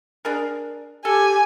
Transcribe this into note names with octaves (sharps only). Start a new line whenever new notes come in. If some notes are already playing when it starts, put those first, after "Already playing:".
D4 G#4 A#4
G4 A4 G#5